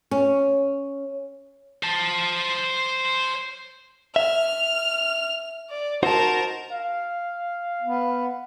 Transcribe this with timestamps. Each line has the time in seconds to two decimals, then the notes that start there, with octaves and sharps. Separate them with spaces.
0.11 C#4
1.83 C5 A5
4.16 E5 F6
5.70 D5
6.03 D#4 F#4 A#4 C5 A5
6.71 F5
7.82 B3